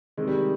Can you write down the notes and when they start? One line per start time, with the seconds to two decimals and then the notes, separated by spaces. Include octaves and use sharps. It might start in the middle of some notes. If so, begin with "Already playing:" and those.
0.17 C3 D#3 G#3
0.28 G3